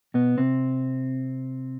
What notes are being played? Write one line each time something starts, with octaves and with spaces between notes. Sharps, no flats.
B2 B3
C3 C4